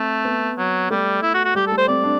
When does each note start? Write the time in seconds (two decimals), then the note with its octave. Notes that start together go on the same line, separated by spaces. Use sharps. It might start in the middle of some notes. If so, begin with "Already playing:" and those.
Already playing: A3 C4
0.25 B3
0.58 F#3
0.90 G3 A3
1.22 E4
1.34 F#4
1.45 F#4
1.55 G3 G4
1.67 A4
1.72 A3
1.78 C5
1.88 C4 D5
2.03 D4